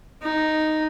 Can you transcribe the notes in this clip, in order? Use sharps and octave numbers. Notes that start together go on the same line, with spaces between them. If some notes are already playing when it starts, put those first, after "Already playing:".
D#4